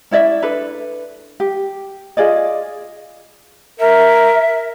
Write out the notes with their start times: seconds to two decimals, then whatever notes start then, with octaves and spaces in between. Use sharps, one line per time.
0.11 C#4 E4 D5 E5
0.42 D4 A4 B4
1.40 G4
2.17 F4 G#4 D5 D#5
3.80 A#4 E5